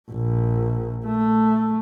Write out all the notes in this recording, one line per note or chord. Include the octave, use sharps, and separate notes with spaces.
A#1
A3